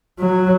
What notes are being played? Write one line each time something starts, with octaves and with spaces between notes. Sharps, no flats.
F#3